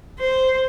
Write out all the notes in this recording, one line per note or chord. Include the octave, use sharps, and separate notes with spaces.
C5